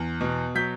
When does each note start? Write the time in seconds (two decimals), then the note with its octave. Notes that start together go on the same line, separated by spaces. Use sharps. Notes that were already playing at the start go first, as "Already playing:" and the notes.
Already playing: E2
0.21 B2
0.55 F#3 G6 B6